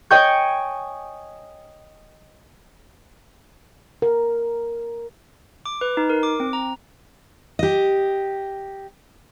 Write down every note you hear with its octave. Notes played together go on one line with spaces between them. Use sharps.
C#5 D#5 G5 G#5 C#6 G6
A#4
D6
B4
D#4
A#4
D6
C4
A#5
G4 D#5